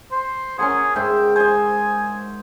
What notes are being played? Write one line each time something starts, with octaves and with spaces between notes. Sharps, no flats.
C5
C#4 G#4 A#4 F#5
G#2 E5 G5 C6
C5 D#5 G#5